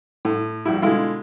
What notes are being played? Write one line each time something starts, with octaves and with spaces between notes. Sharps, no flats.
A2
A#1 G3 E4
B2 D3 G#3 E4 F4